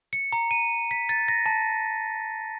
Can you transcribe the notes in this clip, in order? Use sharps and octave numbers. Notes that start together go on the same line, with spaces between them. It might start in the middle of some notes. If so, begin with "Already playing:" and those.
C#7
A#5
D#7
B6
A6
A#6
A5